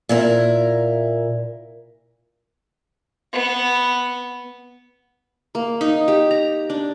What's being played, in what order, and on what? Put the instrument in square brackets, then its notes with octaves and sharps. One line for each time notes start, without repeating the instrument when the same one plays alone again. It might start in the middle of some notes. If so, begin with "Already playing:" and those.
[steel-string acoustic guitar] A#2 E4 A#4
[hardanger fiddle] B3
[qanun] A#3
D#4
G4
A#5
D4